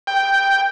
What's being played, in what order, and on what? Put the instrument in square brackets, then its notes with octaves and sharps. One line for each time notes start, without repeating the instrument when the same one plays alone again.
[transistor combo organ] G5